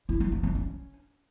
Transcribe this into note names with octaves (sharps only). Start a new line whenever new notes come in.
E4
G3
C4
G3
C#4